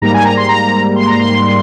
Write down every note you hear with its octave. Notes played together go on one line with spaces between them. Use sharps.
G#2 G3 A#3 A#5
G#5
A#5
C6
A#5
C6
A#5
C6